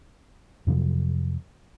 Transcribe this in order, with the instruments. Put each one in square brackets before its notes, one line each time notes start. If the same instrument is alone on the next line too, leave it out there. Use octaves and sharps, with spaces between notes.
[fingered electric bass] F2 C3 F3 F#3